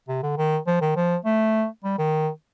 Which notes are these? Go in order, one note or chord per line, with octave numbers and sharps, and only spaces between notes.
C3
D3
D#3
F3
D#3
F3
A3
G3
D#3